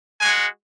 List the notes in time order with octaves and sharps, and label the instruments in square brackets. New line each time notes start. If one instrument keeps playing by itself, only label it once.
[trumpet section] G#3 F#4 G#5